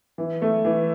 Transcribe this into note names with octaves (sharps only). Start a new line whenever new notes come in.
E3
A3
E3